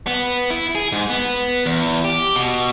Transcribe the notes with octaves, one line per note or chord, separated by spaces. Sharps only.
B3
E4
G#4
G#2
B3
E2
G4
B2